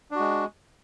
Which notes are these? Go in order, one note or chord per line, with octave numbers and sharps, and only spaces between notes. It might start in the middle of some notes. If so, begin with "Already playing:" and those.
G#3 D4 F#4